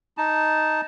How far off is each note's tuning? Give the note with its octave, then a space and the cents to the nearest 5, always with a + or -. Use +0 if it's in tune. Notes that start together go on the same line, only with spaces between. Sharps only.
D#4 +0 A5 +0